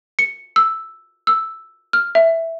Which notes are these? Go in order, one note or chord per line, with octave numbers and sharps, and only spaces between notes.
C#7
E6
E6
F6
E5